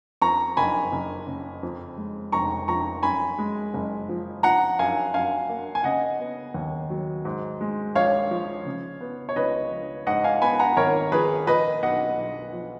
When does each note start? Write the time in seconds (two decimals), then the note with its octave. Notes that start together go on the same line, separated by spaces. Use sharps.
0.21 F2 A#5 C#6
0.57 F#1 G#5 B5
0.92 F#1
1.27 C#3
1.63 F2
1.97 G#3
2.32 F1 A#5 C#6
2.68 F3 A#5 C#6
3.03 F#2 G#5 B5
3.39 G#3
3.74 F#1
4.09 F3
4.43 F3 F#5 A#5
4.79 F#2 F5 G#5
5.14 F#2 F5 G#5
5.49 A#3
5.75 G#5
5.84 C#3 D#5 F#5
6.19 B3
6.54 D#2
6.90 F#3
7.25 G#2
7.61 G#3
7.95 A#1 C#5 F5
8.31 F3
8.66 C#3
9.01 B3
9.29 C#5
9.36 C#2 B4 D#5
9.71 F3
10.07 G#2 D#5 F#5
10.24 F5 G#5
10.42 B3 G#5 B5
10.60 F#5 A#5
10.77 G#1 A#4 C#5
11.12 F3 G#4 B4
11.47 A#2 B4 D#5
11.83 B1 D#5 F#5
12.17 B1
12.53 F3